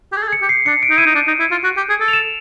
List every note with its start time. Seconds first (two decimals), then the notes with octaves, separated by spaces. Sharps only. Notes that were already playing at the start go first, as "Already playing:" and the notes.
0.12 G4
0.17 G#4
0.23 A4
0.28 G#4
0.33 C#7
0.42 G4
0.49 C7
0.66 D4 C#7
0.83 D7
0.90 D#4
0.98 E4 D#7
1.06 D#4
1.15 D4
1.27 D#4
1.40 E4
1.51 F4
1.64 F#4
1.77 G4
1.89 G#4
2.01 A4
2.08 F7
2.13 E7